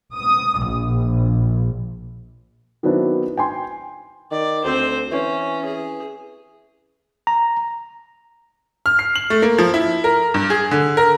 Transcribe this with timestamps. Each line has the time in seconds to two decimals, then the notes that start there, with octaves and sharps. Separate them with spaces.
0.13 D#6
0.63 A#1
2.83 D#3 F#3 B3 C4 D4 E4
3.37 G5 G#5 C6
4.31 D#3 D5
4.64 D2 C4 C5
5.11 E3 C#4
5.65 G#4
7.27 A#5
8.86 F6
8.99 C7
9.15 F#7
9.30 A3
9.42 A#3
9.58 F3
9.74 E4
10.04 A#4
10.34 G2
10.50 G#4
10.71 D3
10.97 A#4